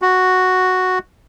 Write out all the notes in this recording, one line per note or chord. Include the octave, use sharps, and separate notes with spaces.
F#4